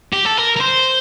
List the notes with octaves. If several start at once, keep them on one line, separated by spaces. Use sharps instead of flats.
G4
A4
A#4
A#4
C5